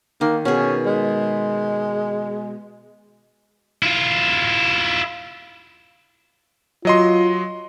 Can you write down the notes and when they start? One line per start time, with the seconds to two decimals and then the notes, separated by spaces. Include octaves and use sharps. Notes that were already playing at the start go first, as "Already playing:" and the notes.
0.21 D#3 A#3
0.45 B2 C#4 G#4
0.86 G#3
3.83 E4 F4
6.85 F#3 F4 D#5 C6